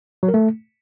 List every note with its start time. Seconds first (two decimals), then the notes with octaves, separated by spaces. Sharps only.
0.23 F#3
0.28 A#4
0.34 A3